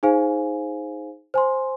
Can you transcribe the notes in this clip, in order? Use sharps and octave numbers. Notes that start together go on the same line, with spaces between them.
D#4 G#4 C5 F5 G#5
C5 G#5 C6